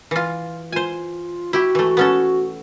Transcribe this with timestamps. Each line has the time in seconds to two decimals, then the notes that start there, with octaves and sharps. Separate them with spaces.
0.11 E3 F4
0.72 F4 C5 G#5
1.53 E4 F#4 G4
1.75 E3 A3
1.97 B3 C#4 A4